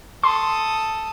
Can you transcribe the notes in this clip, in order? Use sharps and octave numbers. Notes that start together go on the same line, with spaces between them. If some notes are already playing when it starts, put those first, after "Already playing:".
A4 C6 D#6